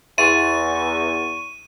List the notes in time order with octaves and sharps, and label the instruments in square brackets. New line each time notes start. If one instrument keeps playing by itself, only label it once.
[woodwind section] E2 [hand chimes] E5 C6 A6 [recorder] C#6 [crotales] D#7